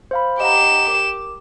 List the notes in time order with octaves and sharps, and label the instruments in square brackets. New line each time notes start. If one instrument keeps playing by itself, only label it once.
[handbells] C5 F5 B5
[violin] G4 E7 [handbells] D#5 F#5 A#5
[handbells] A#4 D6